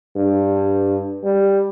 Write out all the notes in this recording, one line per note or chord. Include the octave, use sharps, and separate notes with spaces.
G2
G3